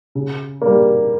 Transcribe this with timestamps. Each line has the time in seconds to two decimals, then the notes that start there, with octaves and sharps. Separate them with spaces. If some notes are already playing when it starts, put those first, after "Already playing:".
0.15 C#3
0.62 G3 A#3